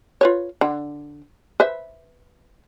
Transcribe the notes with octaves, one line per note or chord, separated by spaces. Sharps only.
F4 B4 C#5
D3
B4 C5 E5